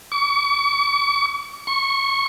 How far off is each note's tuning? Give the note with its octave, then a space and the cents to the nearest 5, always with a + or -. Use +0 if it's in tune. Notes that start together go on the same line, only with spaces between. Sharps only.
C#6 +45
C#6 -15